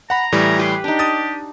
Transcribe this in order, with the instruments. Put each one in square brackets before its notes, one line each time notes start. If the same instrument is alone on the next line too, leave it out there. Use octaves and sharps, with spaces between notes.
[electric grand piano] F#5 B5 [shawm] A#5
[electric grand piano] A2 E3 G3
[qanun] G4 B4 D6 [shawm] C6
[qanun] D4 D#4 [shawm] G4
[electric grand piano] D#6 A6